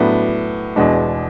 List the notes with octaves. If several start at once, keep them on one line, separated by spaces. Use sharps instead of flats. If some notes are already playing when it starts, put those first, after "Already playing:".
Already playing: A2 F#3 B3 D4
E2 B2 G#3 D4